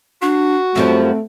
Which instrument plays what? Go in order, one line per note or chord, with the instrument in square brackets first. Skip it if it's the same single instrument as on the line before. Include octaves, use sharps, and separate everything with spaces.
[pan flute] D4 [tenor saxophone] F#4
[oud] F#2 F3 G3 [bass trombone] A3 [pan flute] C4